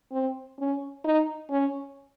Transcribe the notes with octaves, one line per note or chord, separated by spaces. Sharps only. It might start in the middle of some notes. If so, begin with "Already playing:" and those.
C4
C#4
D#4
C#4